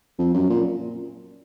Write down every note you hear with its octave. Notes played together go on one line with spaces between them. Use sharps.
F2
F#2
A#2